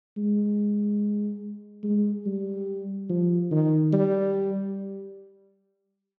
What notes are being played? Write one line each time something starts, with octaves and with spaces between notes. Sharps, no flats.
G#3
G#3
G3
F3
D#3
G3